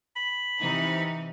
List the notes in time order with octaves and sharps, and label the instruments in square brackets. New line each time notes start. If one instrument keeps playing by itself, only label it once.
[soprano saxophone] B5
[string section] C3 E3 D#4